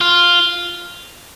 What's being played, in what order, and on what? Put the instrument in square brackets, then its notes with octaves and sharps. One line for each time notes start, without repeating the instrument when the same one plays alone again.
[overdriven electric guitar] F4